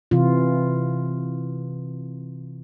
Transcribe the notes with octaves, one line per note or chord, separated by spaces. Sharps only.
C3 E3 F4